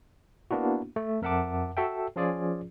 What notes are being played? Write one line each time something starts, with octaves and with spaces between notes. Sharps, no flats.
A#3 B3 D4 E4 F#4
A3
F2 A#4 E5 F#5 A5 D6
F#4 A4 E5 G5
F3 C#4 F4 G#4 D5